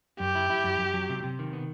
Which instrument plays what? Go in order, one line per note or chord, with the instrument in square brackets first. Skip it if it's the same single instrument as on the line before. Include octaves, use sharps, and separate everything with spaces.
[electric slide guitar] F#2 [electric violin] G4
[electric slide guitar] E4
E4
F#2
F#2
F#3
C3
C3
D#3
B3